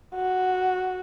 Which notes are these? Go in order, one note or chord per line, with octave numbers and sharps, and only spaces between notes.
F#4